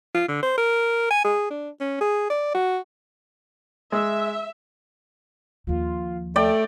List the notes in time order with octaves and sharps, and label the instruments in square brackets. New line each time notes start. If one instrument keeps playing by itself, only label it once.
[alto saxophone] F4
D3
C5
A#4
G#5
G#4
D4
C#4
G#4
D5
F#4
[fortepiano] G#3 [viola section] E5
[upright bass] D#2 F3 [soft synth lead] F4
[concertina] A3 [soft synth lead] A4 [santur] D5 G5